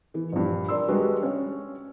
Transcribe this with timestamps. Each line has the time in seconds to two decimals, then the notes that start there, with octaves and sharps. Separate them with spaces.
0.14 E3
0.32 A#1 G2
0.68 A#4 D5 C6 E6
0.88 G3 G#3 D4 F#4 B4
1.23 C#4 C#5